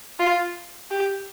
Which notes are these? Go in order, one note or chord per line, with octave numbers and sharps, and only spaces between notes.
F4
G4